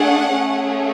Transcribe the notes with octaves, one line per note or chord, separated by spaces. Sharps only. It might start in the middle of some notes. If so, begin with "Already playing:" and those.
Already playing: A3 D4 G#4 F#5
A3 C#4 G#4